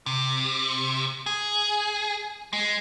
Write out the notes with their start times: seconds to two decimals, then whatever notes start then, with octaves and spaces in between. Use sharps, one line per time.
0.06 C3
1.26 G#4
2.53 G#3